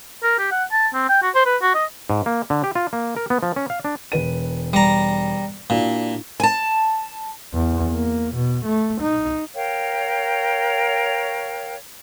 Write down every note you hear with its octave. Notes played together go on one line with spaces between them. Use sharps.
A#4
G4
F#5
A5
C4
G5
F#4
C5
B4
F#4
D#5
G#2
A#3
D3
G4
F4
A#3
A#4
B3
F3
C#4
F5
D4
E1 B4 D#7
G3 A#5
A#2 D4 E4 F#4
G#5 A5
E2
A#3
B2
A3
D#4
A#4 C#5 F5 G5